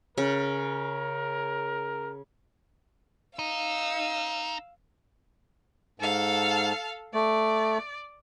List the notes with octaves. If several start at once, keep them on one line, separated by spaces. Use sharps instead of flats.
C#3 A#4
D#4 F5 E6
G#2 A4 F5
A3 D5